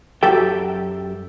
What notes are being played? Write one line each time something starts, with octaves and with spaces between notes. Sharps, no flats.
F#2 F#3 G4 A4 G5